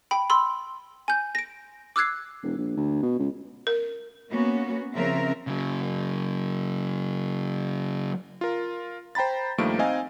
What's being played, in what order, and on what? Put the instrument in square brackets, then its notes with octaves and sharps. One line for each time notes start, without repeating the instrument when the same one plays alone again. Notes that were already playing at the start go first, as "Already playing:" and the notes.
[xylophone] G5 B5
B5 C6 E6
G#5 G6
A#6 D7
D6 E6 F#6 G#6 C7
[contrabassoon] E1
A#1
D2
B2
C#2
[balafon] A#4
[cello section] A#3 B3 C#4 F#4
C#3 F3 C4 A#4 E5
[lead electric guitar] C#3 F#3
[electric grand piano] F4 A#4
C5 G5 A#5 B5 A6
G2 D#3 F3 A3 A#3 D7
C4 D#4 D#5 F5 G#5